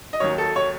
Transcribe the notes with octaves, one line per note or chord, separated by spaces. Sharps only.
D#5
D#2 D#3 F#3 C#5
A4
C#5